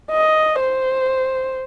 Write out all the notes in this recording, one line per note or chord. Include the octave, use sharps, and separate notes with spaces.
D#5
C5